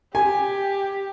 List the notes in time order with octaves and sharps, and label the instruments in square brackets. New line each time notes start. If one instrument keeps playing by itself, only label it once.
[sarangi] G4 [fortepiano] G#5